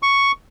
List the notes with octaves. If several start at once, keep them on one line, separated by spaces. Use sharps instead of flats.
C#6